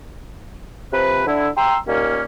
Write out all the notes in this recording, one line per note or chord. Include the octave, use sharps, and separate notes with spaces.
C3 F3 B4
D3 E4
G5 A#5 C6 E6
D#2 A#2 A#3 C#4